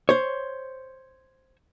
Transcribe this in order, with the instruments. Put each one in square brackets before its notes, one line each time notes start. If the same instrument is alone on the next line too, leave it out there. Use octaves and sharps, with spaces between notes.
[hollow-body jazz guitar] C5 C#5